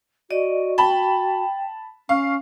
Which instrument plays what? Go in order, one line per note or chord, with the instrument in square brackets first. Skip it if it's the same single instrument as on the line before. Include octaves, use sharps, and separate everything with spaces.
[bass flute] F#4 [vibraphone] D5 D#5
[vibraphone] G5 [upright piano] A5 B5
[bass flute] C#4 [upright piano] F5 [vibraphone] C#6